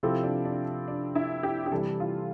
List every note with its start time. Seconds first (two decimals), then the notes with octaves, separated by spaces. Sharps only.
0.03 C3 F3 C4 E4 A4
0.23 D4
0.45 D4
0.88 D4
1.15 E4
1.43 G4
1.66 G4
1.71 C3 E3 G3 A4
2.00 F4